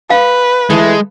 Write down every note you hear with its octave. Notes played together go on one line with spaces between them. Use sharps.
B4 F5
E3 G#3 A3 A4